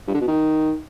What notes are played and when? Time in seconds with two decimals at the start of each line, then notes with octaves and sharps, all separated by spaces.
0.08 G2
0.14 D3
0.21 B2
0.28 D#3